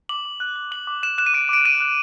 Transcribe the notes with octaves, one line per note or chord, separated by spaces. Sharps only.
D6 F#7
D6
F#6
F#6
D6 F#7
D6
F#6 E7
F#6 E7
D#7
D6 D7
D6 D7
F#6 D#7
F#6